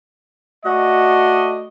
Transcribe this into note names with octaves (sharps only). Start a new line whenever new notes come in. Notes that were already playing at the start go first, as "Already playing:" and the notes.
A3 F#4 D5 D#5